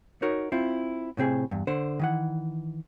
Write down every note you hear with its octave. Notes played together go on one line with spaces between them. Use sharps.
D#4 F#4 A#4 C#5
C4 E4 F4
A2 C3 C4 G#4 G#5
E2 G2
D3 C5
D#3 E3 F#5